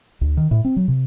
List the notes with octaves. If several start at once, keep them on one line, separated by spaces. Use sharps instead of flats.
D2
D#3
A2
C4
F#3
C3